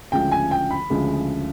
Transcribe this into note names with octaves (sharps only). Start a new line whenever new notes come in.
D2 C#3 F3 G#3 G5
G#5
G5
B5
D2 C#3 F3 G#3